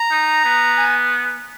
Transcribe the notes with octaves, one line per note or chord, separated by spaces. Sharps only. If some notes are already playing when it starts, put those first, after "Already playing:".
Already playing: A#5
D#4
B3
G#5